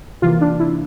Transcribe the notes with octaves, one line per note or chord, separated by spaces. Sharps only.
C3 E3 A#3 F4
D4
E4